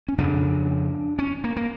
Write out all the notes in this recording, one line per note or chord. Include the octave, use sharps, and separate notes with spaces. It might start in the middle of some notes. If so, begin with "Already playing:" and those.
C#4
F2 C#3 D4
C#4
A#3
A#3